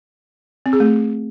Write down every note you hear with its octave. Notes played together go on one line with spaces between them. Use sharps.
C4
G#4
A3